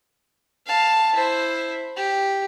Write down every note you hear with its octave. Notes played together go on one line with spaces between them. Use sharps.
F5 A5
E4 C5
G4